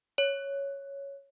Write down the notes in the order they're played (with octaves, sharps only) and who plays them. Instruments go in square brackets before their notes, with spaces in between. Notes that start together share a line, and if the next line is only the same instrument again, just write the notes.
[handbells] C#5